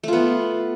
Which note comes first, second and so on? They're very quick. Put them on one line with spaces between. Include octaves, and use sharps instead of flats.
A3 F4 B3